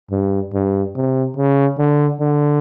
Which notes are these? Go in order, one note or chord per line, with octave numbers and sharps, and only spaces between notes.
G2
G2
C3
C#3
D3
D3